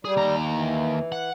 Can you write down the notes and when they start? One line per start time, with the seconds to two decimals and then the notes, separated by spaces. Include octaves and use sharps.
0.05 G3 G#4
0.17 D#2 A#5
0.52 E3
1.12 F#5